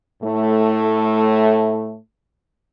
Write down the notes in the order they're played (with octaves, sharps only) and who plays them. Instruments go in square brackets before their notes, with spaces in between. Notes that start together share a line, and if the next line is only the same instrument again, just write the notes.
[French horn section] A2 A3